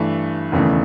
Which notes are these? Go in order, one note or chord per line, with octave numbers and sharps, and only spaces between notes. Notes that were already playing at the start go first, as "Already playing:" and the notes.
Already playing: G2 E3 A3
E1 D#2 C#3 E3 A3